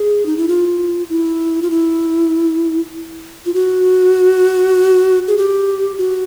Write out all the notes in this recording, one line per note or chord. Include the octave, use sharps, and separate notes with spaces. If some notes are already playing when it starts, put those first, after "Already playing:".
Already playing: G#4
D#4
E4
F4
E4
F4
E4
F4
F#4
G#4
G4
F#4